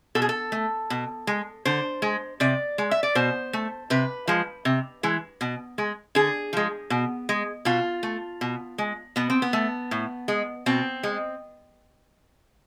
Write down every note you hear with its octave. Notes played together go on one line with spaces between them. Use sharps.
B2 A4
G#4
A4
A3
B2
G#3
D3 C5
G#3
C3 D5
G#3
E5
D5
B2 C5
A3
C3 B4
F3 G#3
C3
E3 G#3
B2
G#3
D3 G#4
F3 G#3
B2
G#3
B2 F4
A3
B2
G#3
B2 B3
C4
B3
A3
A2
G#3
B2 C4
G#3